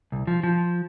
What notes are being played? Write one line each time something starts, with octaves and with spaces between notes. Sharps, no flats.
C2
F3
F3